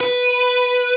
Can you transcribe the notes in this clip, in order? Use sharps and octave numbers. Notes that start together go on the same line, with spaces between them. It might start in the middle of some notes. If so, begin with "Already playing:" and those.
B4